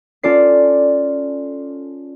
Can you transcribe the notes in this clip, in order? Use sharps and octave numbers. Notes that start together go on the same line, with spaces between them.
C#4 F4 A4 D5 C7